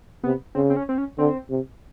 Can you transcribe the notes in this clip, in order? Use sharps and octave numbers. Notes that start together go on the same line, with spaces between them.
C3 B3
C#3 C4
C4
C#4
C4
C#4
D3 C4
C3